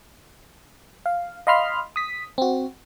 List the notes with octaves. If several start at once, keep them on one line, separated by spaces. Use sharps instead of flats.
F5
D#5 F5 B5 C6 F6
D#6 B6
C4 F#4